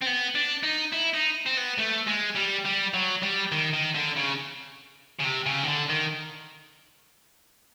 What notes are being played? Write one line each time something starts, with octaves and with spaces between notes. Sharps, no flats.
C4
B3
D4
D#4
E4
D#4
C4
B3
A3
G#3
G3
G3
F#3
G3
D#3
D#3
D3
C#3
C#3
C3
C#3
D#3
D3
D#3